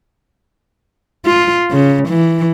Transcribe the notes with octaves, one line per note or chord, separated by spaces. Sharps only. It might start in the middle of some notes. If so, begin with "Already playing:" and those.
F4
C#3
E3